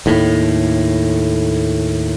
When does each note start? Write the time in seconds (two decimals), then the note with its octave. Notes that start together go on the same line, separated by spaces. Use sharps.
0.06 D#2 A2